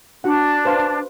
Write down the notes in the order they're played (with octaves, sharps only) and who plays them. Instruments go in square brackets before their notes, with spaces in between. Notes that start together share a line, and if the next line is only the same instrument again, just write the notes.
[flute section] D4 [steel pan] F#4 F#5
[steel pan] B4 C5 F5